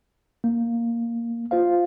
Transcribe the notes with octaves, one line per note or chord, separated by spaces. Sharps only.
A#3
F4 C5 F5